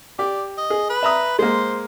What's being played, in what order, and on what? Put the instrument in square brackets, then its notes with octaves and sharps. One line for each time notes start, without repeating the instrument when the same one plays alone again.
[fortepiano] G4 [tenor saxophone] D5
[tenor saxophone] D#5
[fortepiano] G#4
[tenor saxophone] B4
[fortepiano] E5 A#5 D#6
[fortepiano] G#3 A#3 [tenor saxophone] C5